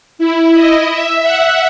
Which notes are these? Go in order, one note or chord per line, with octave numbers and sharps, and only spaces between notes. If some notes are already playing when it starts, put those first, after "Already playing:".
E4
D#5
E5
F#5